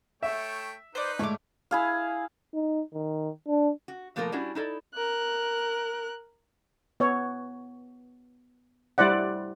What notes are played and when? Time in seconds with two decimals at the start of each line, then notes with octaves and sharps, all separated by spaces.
0.23 A3 C#5 E5 G5
0.95 D#4 B4 C5 D5
1.19 G#2 A3 C#5 D6
1.71 E4 G#4 F5
2.54 D#4
2.94 D#3
3.47 D4
3.88 F#4
4.16 B2 F3 A3 A#3 A4 A#4
4.32 G3 C#4 D4 E4 F#4 F#5
4.55 D#4 E4 A4 D5
4.94 A#4 F#6
7.00 B3 C#5
8.98 G3 E4 C5 D5 F#5